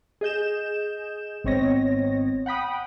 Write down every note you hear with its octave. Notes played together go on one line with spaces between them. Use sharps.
G#4 D#5 G6 E7
G#1 B3 C4 C#5 D#5 A#6
F#5 G5 B5 D#6